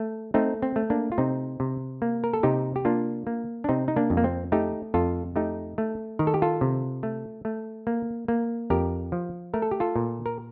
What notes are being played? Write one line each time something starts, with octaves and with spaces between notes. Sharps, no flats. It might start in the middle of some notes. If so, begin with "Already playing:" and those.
Already playing: A3
A3 C4 D#4
C4
A3
A#3 D4
F4
C3 C4 D#4
C3
A#3
A#4
A4
C3 D#4 G4
G4
A#3 D4 F4
A#3
D4
C3 C4 D#4
D#4
A#3 D4
F2
A#3
C4
A3 D#4 G4
F2 F4 A4
A3 D#4 G4
A3
D#3 A#4
A4
G4
F4 A4
C3
A3
A3
A#3
A#3
F2 G4 A#4
F3
A3 A#4
A4
G4
F4 A4
A#2
A#4